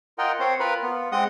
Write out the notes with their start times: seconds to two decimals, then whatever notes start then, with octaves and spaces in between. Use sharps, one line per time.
0.18 F4 A#4 D#5 F#5 G5
0.40 C4 C5 C#5
0.60 F4 A#4 B4 B5
0.83 B3 F4
1.12 G#3 C4 D#5 F#5 D#6